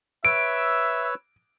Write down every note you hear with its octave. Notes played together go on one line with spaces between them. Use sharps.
B4 C#5 E5 E6 D7